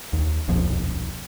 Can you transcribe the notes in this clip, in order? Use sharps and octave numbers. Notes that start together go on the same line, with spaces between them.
D#2
D#1 B1 F2 F3